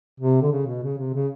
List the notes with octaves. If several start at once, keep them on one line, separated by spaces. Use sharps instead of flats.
C3
D3
C#3
B2
C#3
C3
C#3